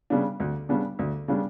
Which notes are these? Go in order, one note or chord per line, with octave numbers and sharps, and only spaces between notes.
C#3 G3 B3 D4
D2
C#3 G3 B3 D4
D2
C#3 G3 B3 D4